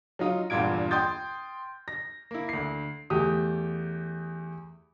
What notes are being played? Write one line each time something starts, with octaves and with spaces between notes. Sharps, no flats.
F#3 D#4 F4 D#5
E2 G2 A#2 F4 G#6 D7
G5 C6 D#6 G6 A6
A#6
A#3 E4
D2 C7
E2 A3 G4 D#6